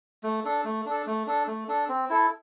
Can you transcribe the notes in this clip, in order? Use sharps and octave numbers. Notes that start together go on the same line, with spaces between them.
A3
D4 A4
A3
D4 A4
A3
D4 A4
A3
D4 A4
C4
E4 A4